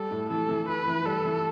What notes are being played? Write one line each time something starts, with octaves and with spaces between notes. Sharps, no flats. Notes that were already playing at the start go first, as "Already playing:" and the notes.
Already playing: G3 A4
A2
E3 A4
E3
E4 B4
E3
G3 A4
E3